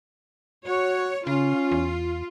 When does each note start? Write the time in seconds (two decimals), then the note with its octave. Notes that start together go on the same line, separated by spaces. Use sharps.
0.66 F#4 C#5
1.27 C#3 C#4 F4
1.71 E2